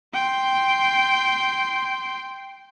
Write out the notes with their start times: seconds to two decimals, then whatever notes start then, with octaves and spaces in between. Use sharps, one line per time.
0.14 G5 C6